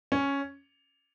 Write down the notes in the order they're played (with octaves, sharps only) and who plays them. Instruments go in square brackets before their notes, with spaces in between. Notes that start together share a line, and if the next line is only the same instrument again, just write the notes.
[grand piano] C#4